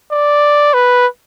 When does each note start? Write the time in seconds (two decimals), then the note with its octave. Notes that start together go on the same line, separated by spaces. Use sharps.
0.12 D5
0.74 B4